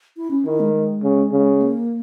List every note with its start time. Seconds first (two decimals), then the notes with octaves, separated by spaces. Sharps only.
0.17 E4
0.31 C#4
0.46 D#3 E4
0.60 G#3
0.74 G#3
1.03 C#3
1.32 C#3
1.62 A#3